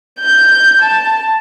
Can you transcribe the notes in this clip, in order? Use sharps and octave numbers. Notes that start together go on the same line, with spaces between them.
G6
A5